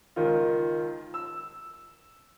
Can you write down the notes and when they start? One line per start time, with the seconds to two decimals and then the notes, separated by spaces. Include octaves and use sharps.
0.16 C#2 D#3 F4
1.14 E6